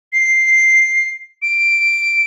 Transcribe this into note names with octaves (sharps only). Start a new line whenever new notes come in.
C7
D7